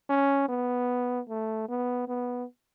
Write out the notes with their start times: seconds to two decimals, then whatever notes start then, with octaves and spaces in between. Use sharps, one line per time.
0.10 C#4
0.49 B3
1.29 A3
1.69 B3
2.08 B3